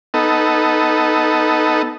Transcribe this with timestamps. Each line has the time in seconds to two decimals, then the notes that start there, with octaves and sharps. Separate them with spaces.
0.14 B3 D#4 A4